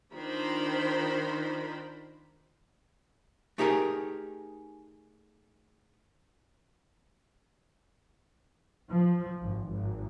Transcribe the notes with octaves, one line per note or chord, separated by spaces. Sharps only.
D#3 D4 F4 A#4 C5 B5
A3 D#4 G4 G#4 A#4
F3
G#1
G#1